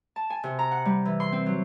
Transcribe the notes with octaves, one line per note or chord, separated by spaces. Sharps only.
A5
G#5
C3
A#5
F#5
G3
E3
C6
C4
F#3